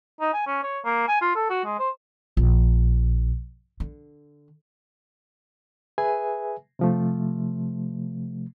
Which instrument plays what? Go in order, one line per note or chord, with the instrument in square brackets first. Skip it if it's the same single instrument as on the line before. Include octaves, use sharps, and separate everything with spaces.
[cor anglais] D#4
G#5
C#4
C#5
A#3
G#5
F4
A4
F#4
G#3
C5
[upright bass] A#1
D3
[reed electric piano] G#4 B4 E5 G#5
C3 F3 A3